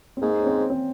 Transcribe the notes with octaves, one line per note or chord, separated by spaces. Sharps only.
C4
G#2 A#3
C#4
C4
C4